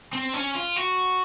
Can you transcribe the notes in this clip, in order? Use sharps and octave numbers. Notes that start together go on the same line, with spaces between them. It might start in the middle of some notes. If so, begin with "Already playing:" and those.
C4
C#4
F4
F#4